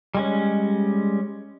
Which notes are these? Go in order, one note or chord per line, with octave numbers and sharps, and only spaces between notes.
G3 G#3 C#4